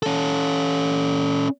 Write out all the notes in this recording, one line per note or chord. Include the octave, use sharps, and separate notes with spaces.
C#4 A4